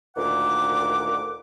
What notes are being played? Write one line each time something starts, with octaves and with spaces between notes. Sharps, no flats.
D2 A#2 D#3 F#5 D6